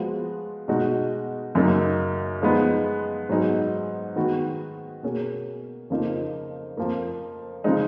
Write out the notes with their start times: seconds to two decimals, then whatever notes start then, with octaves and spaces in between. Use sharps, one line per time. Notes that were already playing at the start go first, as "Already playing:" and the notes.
Already playing: F3 G#3 B3 F#4
0.68 B2 G#3 D#4 F#4
1.55 F#2 C#3 F#3 A#3 D#4
2.42 F3 G#3 B3 D#4
3.29 G#2 F#3 B3 D#4 G#4
4.16 D#3 G#3 B3 F#4
5.03 B2 A#3 C#4 G#4
5.90 F2 C#3 F3 A#3 D#4
6.77 F2 F3 A#3
7.64 C#3 F3 G#3 D#4